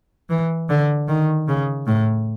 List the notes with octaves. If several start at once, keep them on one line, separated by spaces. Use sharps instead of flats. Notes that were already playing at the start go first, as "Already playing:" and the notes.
E3
D3
D#3
C#3
A2